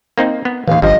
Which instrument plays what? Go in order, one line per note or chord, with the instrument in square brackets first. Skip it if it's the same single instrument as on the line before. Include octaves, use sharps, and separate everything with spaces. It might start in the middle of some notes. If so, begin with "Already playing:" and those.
[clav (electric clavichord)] A#3 C4 D#4
B3
[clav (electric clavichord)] A1 D#2 [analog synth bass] E3 [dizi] F5
[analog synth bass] G#1 [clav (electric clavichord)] G2 F3 [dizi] D#5